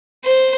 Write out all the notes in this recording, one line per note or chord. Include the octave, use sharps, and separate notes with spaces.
C5